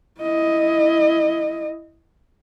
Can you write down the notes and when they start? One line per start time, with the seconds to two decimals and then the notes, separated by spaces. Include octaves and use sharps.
0.21 E4 D#5